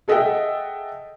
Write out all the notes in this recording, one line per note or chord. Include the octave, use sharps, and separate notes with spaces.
G#4 A4 D#5 E5 F#5 G5